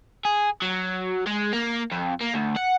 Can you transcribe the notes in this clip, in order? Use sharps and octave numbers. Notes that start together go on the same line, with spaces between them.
G#4
F#3
G#3
A#3
F2
A#3
D2
F#5